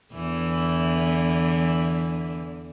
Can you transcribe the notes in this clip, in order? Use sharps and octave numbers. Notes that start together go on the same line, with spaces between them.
E2 D3 E3